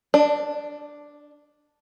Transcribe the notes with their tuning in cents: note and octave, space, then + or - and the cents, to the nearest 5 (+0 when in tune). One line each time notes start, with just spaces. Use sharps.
D4 +0 D5 +35